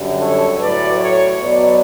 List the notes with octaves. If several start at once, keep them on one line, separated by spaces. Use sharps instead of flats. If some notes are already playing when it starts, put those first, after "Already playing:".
Already playing: F#2 D3 G3
A4 C#5
A2 F#3 B4 D5
A4 C#5
B2 F#3 B4 D5